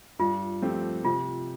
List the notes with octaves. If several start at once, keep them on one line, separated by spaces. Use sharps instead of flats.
G2 F4
F3 A3 C4 G4
C3 F4